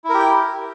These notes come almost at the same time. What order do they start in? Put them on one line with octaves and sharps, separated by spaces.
E4 A#4 G4 G5